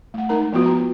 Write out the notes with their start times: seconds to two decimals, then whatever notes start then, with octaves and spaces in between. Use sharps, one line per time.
0.14 A3 F#5
0.29 G#3 D#4 A#4 A#5
0.53 F3 B3 F4 F#4 B4
0.66 A#5